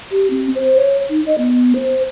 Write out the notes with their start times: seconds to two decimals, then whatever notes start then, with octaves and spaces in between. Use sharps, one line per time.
0.11 G4
0.30 C4
0.55 C5
0.76 C#5
1.10 D#4
1.26 D#5
1.38 B3
1.75 C5